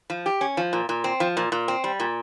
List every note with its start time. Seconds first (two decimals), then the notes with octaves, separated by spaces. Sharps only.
0.10 F3
0.26 G4
0.41 C#4
0.57 F3
0.73 A#2
0.89 A#2
1.04 C4
1.20 F3
1.37 A#2
1.52 A#2
1.68 C4
1.84 G3
2.00 A#2